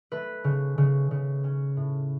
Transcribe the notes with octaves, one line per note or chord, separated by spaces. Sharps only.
A3 B4
C#3
C#3
C#3
C#4
A2